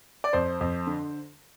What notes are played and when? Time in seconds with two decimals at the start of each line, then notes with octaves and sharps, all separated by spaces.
0.24 D5
0.33 F2 C5
0.61 F2
0.87 D3